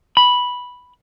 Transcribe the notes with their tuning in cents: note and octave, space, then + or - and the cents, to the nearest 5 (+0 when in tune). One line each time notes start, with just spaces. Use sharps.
B5 -5